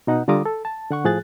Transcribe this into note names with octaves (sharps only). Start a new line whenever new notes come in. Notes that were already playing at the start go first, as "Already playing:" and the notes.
B2 D#4 F#5
D3 G3 F4 A#5 D6 D#6
A4
A5
D3 F#5 C#6
A2 F3 G#4 F#6 A6